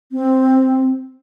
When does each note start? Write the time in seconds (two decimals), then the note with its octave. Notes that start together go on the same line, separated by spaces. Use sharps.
0.12 C4